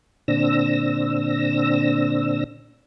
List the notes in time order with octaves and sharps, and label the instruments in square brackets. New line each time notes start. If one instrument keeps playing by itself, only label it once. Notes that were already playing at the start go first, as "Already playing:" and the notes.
[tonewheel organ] A#2 D3 C4 D4 E6 A#6